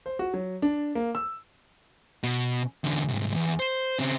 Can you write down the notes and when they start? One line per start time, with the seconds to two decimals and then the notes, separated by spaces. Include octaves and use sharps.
0.06 C5
0.19 F#4
0.34 F#3
0.62 D4
0.95 A#3
1.15 E6
2.23 B2
2.84 E2 D3
3.08 C2 G#2
3.35 E2
3.59 C5
3.99 C#3 C4